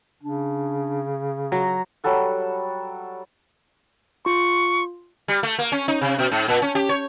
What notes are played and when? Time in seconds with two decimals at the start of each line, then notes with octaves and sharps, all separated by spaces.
0.23 C#3 D4
1.52 F#3 A#5
2.04 F#3 G3 A4 F#5
4.25 F4 C6 C#6
5.28 G3
5.43 A3
5.59 A#3
5.72 C#4
5.88 D#4
6.01 C3
6.18 B2
6.32 G#2
6.48 A#2
6.62 C#4
6.75 G4
6.89 C#5